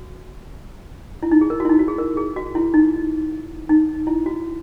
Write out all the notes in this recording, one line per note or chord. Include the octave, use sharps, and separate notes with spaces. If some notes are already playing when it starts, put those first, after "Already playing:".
Already playing: F#4
E4
D#4
G#4
A#4
F#4
E4
D#4
F#4
G#4
A#4
G#4
F#4
E4
D#4
D#4
E4
F#4